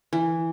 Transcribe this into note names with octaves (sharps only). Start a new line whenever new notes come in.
E3